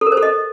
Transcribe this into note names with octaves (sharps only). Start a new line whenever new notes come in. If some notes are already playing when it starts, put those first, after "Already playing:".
A4
A#4
C5
A4
D#5